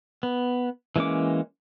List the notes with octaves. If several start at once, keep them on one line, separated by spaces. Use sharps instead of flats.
B3
E3 G#3 A#3 C#4 D6